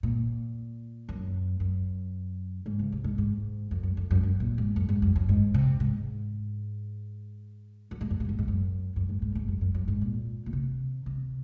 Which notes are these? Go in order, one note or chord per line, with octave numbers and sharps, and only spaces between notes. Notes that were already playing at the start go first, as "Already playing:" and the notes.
A#2
F#2
F#2
G#2
C#3
C3
G#2
G#2
F2
F#2
F2
F#2
F#2
A#2
G#2
F#2
G#2
F#2
F#2
G#2
C3
G#2
F#2
G#2
F#2
G#2
F#2
G#2
F#2
F#2
G#2
G#2
G#2
F#2
F#2
F#2
G#2
A#2
A#2
C3
C3